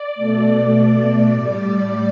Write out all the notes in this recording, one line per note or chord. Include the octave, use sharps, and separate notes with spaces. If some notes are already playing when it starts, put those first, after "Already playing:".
Already playing: D5
B2 A3
A2 G3